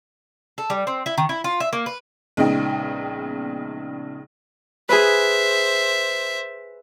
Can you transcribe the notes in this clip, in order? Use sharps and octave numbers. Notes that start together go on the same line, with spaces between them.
A4
G3
C4
E4
D#3
E4
F4
E5
A#3
B4
A#1 C#3 G#3 B3 D#4 G5
G#4 B4 C5 E5